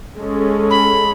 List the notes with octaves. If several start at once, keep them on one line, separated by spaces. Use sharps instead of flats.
G#3 C#4 A4
B5